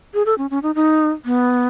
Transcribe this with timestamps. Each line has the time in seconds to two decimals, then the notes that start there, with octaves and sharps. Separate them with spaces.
0.14 G#4
0.26 A4
0.38 C#4
0.51 C#4
0.63 D#4
0.75 D#4
1.25 B3